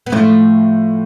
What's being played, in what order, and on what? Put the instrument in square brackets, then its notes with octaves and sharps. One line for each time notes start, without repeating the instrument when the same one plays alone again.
[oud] B3
[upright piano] A2 [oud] F3 A3